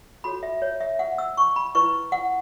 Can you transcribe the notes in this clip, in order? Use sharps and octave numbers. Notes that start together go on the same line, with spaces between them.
F#4 A4 C#5 B5
E5
C#5
E5
F#5
E6
C#6
B5
E4 B4 C#6
F#5